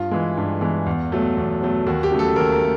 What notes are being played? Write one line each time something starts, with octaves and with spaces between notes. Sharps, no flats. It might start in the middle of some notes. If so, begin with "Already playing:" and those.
Already playing: G2 F4
E3 G#3
G2
E3 G#3
E2
B2 F#3 A3
E2
B2 F#3 A3
D#2 F#4
G4
C#3 F#3 A3
A4
D#2 A#4
A#4
A3